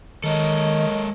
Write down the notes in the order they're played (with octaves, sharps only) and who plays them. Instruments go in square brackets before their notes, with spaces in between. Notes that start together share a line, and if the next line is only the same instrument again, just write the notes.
[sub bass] D#3 [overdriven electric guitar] G#3 A4 [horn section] A#4 C#5 [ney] D#5